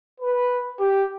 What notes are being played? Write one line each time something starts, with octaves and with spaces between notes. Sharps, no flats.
B4
G4